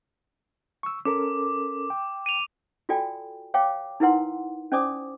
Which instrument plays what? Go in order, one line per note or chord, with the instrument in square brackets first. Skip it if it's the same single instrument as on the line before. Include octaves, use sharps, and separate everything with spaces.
[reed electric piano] C#6 E6
[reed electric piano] C#4 A4 A#4 [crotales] D6
[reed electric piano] G5
[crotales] D#7 F7
[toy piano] F4 F#4 A4 D5 G5 G#5
C#5 F5 G5 D6
D#4 E4 A#4 B4 F#5 C6
C#4 C5 D5 G#5 D6 D#6